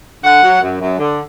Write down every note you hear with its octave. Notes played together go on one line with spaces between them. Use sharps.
D3 F#5
F#3
F#2
F#2
D3